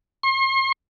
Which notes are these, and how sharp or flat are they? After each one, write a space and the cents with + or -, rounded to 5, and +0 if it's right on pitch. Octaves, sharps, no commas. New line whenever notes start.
C6 +45